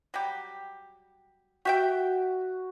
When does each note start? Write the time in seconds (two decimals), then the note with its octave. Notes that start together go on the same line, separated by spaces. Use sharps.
0.14 F#3 G3 G4
1.65 F#4 G4 E5 G5